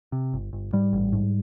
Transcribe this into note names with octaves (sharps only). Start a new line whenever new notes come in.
C3
G1
G1
G#2 G3
A1
G#2